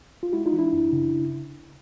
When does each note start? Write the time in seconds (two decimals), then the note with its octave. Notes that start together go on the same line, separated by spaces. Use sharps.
0.23 F4
0.33 G#3 E4 F#4
0.46 D#4 F4
0.53 E3
0.59 D4 E4
0.72 F#2
0.92 C#3